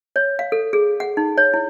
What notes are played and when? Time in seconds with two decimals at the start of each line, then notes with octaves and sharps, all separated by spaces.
0.16 C#5
0.39 F5
0.52 A4
0.73 G#4
1.00 F#5
1.17 D#4
1.38 C#5
1.54 E4